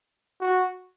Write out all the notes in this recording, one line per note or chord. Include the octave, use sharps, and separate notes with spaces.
F#4